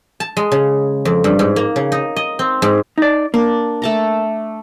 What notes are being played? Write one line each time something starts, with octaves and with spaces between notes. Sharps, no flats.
A5
G#3
C#3
F2
G2
G#2
A#3
C#3
D#4
D#5
C4
G#2
D#4 D5
A#3 D4
A3 A5 A#5